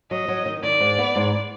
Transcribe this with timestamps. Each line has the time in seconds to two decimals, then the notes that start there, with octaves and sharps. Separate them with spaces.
0.11 F#3 D#5
0.28 F#3
0.46 D#3
0.63 D#3 D5
0.80 G#2
0.99 B3
1.16 G#2